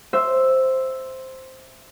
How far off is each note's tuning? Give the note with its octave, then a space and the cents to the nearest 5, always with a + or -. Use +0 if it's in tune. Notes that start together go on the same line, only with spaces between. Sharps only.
C5 +0 E5 +0